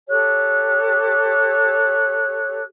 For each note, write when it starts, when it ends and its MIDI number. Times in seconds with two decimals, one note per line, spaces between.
0.09 2.61 67
0.09 2.61 69
0.09 2.61 73
0.09 2.61 90